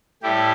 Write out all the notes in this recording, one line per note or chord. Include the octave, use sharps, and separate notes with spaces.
A2 G3 E4 G4